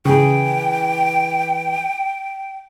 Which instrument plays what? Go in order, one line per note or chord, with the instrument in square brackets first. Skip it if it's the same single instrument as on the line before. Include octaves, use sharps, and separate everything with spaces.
[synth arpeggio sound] C#3 [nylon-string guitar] E3 G#4 [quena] G5